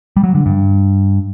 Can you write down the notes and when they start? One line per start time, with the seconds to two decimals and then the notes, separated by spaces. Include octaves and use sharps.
0.17 G3
0.24 F#3
0.35 D3
0.46 G2